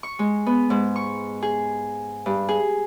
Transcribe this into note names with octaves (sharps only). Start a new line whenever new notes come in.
C#6
G#3
B3
G#2
C#6
G#4
G2
G#4